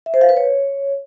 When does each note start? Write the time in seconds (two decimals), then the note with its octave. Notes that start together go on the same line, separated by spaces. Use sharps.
0.06 E5
0.14 C5
0.21 F5
0.29 B4
0.37 C#5